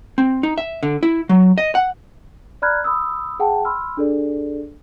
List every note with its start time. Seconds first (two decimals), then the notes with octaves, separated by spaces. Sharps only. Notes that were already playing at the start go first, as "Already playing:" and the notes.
0.18 C4
0.43 D#4
0.58 E5
0.83 D3
1.03 E4
1.29 F#3
1.58 D#5
1.75 F#5
2.62 D5 A#5 B5 F6 F#6 G#6
2.84 B5 D#6 E6
3.39 G#4 F#5 G5 A5
3.65 B5 C6 E6 F6
3.97 D4 G#4 A4 D5